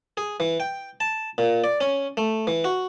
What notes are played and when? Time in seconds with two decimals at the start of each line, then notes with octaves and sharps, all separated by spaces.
0.17 G#4
0.40 E3
0.60 G5
1.00 A5
1.38 A#2
1.64 D5
1.81 C#4
2.17 A3
2.47 E3
2.64 F#4